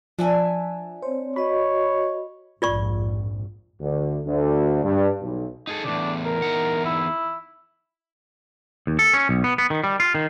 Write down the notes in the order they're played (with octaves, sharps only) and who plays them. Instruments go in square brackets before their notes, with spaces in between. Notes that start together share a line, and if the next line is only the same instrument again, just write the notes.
[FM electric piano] F3 [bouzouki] D4 E5 G#5
[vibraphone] C4 C#5 [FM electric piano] C5
[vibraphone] F#4 D#5 [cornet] C#5 [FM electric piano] B5
[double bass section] A#1 F2 G#2 [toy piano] F4 D5 C#6
[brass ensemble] D2
D2
G2
B1
[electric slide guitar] D#4 G#4 A4
[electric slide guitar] E2 A2 C#3 [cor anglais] D4
[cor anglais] A#4
[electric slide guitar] E2 D#4 F#5
[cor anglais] E4
[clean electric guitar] D#2
A4
C#4
B1
B3
B3
D#3
G3
F4
D#3